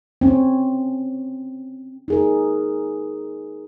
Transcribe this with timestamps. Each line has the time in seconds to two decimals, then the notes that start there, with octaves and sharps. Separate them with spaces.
0.21 C4 C#4
2.08 D#4 G#4 A#4